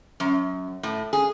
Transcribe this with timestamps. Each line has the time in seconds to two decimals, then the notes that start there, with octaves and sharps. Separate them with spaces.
0.20 F#2
0.83 A2
1.13 G#4